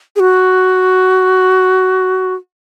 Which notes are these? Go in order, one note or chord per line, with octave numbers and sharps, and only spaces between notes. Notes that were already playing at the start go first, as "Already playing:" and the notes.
G#4
F#4